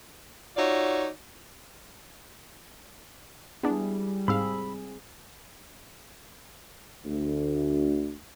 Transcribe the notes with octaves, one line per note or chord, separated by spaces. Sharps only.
D#4 F4 F#4 C#5 D5 E5
G3 B3 D4 E4 G#4
G#2 C4 G#4 F5 B5 E6
D2